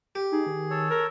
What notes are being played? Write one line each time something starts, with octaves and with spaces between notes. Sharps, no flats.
G4
D#4 G#4
D#3
A4 C#5
A#4